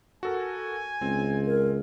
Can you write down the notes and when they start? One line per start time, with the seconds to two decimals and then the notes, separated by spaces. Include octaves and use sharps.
0.23 F#4 A4 A#4 G#5
1.02 C#2 C4
1.46 A#4